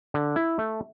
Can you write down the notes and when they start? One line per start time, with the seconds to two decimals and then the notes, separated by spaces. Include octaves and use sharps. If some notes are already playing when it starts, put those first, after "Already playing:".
0.14 D3
0.36 E4
0.58 A3